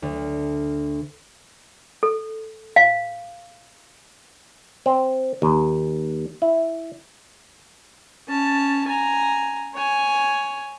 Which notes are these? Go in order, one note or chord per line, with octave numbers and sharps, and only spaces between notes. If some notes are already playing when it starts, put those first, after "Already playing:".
D2
A4
F5
C4
D#2
E4
C#4 A5
G#5 A#5
C#5 G#5